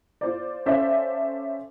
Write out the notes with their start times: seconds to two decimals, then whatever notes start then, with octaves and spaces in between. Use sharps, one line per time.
0.21 F4 C5 D5
0.66 C#4 A4 C5 D5 E5 F5